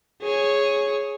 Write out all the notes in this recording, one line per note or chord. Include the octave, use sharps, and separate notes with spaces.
G#4 C#5